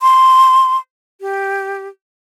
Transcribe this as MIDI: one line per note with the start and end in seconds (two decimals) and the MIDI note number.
0.01 0.77 84
1.21 1.88 67